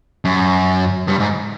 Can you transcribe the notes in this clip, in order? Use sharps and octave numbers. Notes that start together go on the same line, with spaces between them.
F#2
G2
G#2